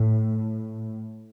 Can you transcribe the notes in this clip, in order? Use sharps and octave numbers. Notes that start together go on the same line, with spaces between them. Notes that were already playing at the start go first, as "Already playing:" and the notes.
Already playing: A2